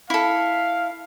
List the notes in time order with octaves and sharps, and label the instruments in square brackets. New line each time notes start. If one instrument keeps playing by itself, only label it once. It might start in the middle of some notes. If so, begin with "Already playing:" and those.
[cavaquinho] E4 A4 [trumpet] F5